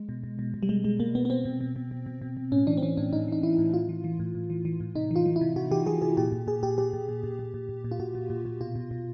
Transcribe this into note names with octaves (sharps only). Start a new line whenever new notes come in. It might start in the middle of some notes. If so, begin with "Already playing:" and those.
Already playing: G#3
B2
B2
B2
B2
G3
B2 G#3
B2 G#3
B2 A#3
B2 B3
B3
B2 C4
B2
B2
B2
B2
B2
B2
B2
A2 C#4
E3 D4
C4
E3 C#4
A2 D4
A2 D#4
E3 D#4
E3 E4
A2
A2 F4
E3
E3
A2
A2
E3
E3
A2
C3 D#4
E3 F4
E3
E4
C3
C3 F#4
E3 G4
E3 G#4
C3 G#4
A#2 G4
A#2
A#2 G#4
A#2 G4
A#2 G4
A#2
A#2
A#2
A#2
A#2
A#2
A#2
F4
A#2 F#4
A#2
A#2
A#2
B2 F4
B2
B2